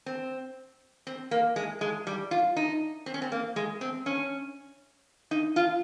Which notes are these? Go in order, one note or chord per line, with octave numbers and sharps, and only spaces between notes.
C4
C4
A#3
G#3
G#3
G3
F4
D#4
C4
C#4
C4
A#3
G#3
C4
C#4
D#4
F4